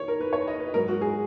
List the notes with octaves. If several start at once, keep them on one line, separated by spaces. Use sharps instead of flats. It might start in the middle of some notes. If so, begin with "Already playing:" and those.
Already playing: D#3 C#5
A#4
B4
C#5
D#5
B4
G#2 F#3 A#4
F#4
G#4